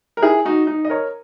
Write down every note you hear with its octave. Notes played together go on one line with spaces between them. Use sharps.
A#4
E4 G#4
D#4 F#4
D#4
D#5
A#4 C#5